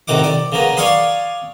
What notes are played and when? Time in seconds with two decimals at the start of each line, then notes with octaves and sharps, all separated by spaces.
0.08 A2 C3 D#3 F#5 D6
0.24 D5
0.52 C#3 A#3 B3
0.77 C#5 D5 F5 G#5 C6 D#6